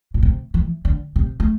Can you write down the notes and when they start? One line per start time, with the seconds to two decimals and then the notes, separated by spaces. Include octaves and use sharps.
0.14 A#2
0.23 C3
0.54 E3
0.85 D3
1.16 C3
1.40 A3